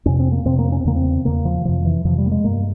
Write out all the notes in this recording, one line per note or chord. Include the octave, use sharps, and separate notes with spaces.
F2 C3 C#4
C4
A#3
F2 C3 C4
A#3
C#4
C4
E2 C#3 A#3
C4
E2 C#3 A#3
F3
F2 C3 F3
E3
F2 C3 F3
G3
A#3
G#3
G2 A#3